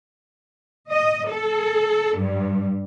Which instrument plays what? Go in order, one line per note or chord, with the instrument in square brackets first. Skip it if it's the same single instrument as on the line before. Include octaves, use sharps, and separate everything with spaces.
[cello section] D#5
A4
G2